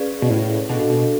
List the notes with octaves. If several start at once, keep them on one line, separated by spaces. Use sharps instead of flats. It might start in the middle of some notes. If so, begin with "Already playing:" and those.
Already playing: C#4 G#4 B4 D5 F5
B2
A2
B2 D4 F#4 A4 F5
B2